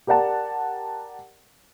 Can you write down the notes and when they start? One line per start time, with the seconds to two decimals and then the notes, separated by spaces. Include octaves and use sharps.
0.07 G4 A#4 D5 F#5 A5